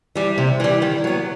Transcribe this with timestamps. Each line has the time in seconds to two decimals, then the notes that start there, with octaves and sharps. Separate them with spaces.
0.15 E3 G3
0.38 C3
0.60 E3 G3
0.82 D#3
1.04 F#3 B3